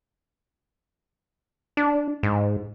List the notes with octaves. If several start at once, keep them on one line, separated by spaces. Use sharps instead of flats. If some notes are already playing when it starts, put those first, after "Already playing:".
D4
G#2